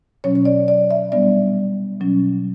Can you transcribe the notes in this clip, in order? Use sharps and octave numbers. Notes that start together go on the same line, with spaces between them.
B2 F#3 C#4 C#5
C#5
D5
D5
E5
A#2 G3 B3 D4 D5
B2 F#3 C#4